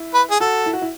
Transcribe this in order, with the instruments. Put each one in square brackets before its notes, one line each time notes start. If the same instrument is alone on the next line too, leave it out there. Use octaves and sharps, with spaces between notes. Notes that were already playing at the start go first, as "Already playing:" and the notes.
Already playing: [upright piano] E4
[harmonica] B4
G#4
[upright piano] F#4 [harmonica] A4
[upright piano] E4
F#4
E4